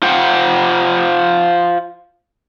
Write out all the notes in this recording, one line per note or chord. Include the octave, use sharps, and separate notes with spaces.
F4 C5 F#5 G5